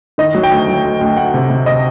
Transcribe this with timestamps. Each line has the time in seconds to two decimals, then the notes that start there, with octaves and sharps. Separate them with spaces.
0.18 D#3 D#5
0.35 F#3
0.43 G5
0.52 D2
0.68 F#3
0.85 D2
1.01 D2
1.17 D2 F#5
1.34 C3
1.50 C3
1.66 C3 D#5